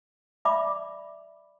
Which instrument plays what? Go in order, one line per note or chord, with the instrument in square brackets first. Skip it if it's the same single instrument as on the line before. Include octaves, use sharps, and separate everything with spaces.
[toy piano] D5 E5 B5 D6